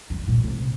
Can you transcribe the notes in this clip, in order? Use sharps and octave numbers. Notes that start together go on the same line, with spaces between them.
G2
A#2
C3